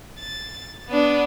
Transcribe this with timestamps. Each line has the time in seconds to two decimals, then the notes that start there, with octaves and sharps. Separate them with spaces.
0.19 A6
0.89 B3 D4